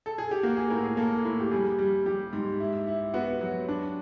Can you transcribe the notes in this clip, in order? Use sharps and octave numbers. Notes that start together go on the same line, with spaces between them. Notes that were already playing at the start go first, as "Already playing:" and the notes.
A4
G#4
G4
A#3 F#4
G#4
A2 A#4
G#4
A#3 A4
A2
G4
G3 G#4
G3
G3 G4
G#2
E4
E4
B3 F#4
F#3
D4